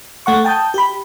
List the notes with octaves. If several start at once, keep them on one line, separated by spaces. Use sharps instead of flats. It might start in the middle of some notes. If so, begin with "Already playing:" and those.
A3 F#5 C#6
G5 A5 D#6 G6
G4 B5